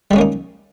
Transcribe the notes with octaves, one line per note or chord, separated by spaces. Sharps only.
G3 G#3 A#3 C#4 D#4